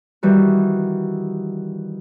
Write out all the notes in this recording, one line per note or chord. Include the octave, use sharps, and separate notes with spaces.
D#3 E3 G3 F#4